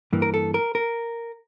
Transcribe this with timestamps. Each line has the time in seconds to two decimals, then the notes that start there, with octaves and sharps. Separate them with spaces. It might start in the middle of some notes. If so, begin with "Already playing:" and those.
0.13 G2 E3 A#3
0.22 A#4
0.34 A4
0.54 A#4
0.75 A#4